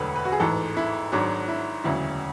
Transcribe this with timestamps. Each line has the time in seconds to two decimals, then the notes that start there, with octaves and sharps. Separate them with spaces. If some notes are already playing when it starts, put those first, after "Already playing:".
Already playing: E1 D2 D3 F#3 A4 B4
0.16 B4
0.25 F#4
0.32 G#4
0.40 A1 G#2 E3 A4
0.77 E4
1.12 G#1 G#2 F#3 D4
1.48 E4
1.84 E1 D2 C#3 F#3 E4